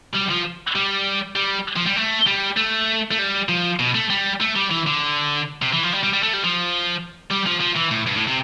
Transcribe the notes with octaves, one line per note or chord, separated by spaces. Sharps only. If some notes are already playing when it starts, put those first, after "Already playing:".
G3
F3
G3
G3
F3
G3
A3
G3
A3
A3
G3
F3
B2
A3
G3
A3
G3
E3
D3
C3
E3
F3
G3
G3
G3
A3
G3
F3
G3
F3
F3
E3
A2
G2
A2
C3